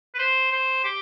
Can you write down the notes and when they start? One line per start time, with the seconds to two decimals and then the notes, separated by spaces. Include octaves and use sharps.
0.14 B4
0.19 C5
0.52 C5
0.84 G4